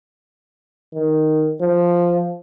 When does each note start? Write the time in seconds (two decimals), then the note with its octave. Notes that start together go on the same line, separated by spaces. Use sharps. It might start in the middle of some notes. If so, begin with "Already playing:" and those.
0.94 D#3
1.61 F3